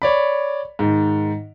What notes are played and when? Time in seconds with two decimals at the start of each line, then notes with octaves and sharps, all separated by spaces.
0.02 C#5 D5 B5
0.79 G#2 D#3